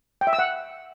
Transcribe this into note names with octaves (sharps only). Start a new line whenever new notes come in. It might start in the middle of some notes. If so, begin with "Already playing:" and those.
G5
E5
E6
F#5